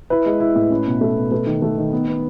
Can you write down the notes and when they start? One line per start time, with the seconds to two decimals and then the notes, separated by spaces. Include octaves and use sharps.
0.10 E4 B4
0.26 G#3
0.40 E4
0.55 A2
0.71 C#4
0.86 B2
1.01 A3
1.16 B2
1.31 A3 B4
1.47 D#3
1.62 A3
1.78 D#3
1.92 B3
2.08 B3